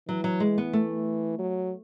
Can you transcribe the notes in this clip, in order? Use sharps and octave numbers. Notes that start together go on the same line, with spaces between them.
E3 F#3
F#3
G#3
B3
A3
F#3